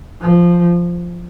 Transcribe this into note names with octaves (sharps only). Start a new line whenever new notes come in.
F3